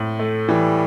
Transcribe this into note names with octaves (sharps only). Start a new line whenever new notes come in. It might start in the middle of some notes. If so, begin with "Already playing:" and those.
Already playing: A2 C4
A3
E3 G3